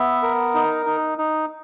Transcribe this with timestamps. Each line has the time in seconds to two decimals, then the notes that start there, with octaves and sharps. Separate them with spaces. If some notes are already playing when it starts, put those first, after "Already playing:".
Already playing: B3 E5
0.22 A#4
0.54 D#4
0.86 D#4
1.18 D#4